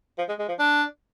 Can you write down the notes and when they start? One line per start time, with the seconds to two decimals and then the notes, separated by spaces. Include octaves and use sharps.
0.18 F3
0.29 G#3
0.39 G#3
0.48 F3
0.59 D4